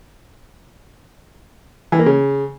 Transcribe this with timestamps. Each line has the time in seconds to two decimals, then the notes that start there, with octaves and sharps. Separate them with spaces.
1.92 E3
1.99 A#3
2.06 C#3